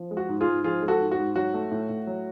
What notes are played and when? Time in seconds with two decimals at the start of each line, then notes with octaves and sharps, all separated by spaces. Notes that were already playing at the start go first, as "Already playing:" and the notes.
Already playing: F3
0.11 G#3
0.17 F#4
0.29 G#2
0.41 F4 G#4
0.47 G#2
0.64 F3 F4 G#4
0.82 G#3
0.88 F#4 A4
1.00 G#2
1.11 F#4
1.18 G#2
1.36 F#3 F#4
1.54 A3
1.71 A2
1.89 A2
2.07 F#3